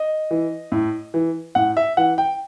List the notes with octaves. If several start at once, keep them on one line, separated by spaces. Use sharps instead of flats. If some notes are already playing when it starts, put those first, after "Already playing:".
Already playing: D#5
E3
A2
E3
A2 F#5
E5
E3 F#5
G5